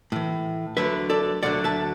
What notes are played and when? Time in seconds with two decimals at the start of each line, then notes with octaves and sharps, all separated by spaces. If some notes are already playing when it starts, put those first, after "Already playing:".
0.12 A2 E3
0.77 D2 D3 F#3 B4 E5
1.10 A4 D5
1.43 D2 D3 F#3 D5 F#5
1.64 E5 A5